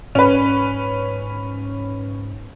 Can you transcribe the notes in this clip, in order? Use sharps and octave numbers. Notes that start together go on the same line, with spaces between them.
G#2 C#4 B4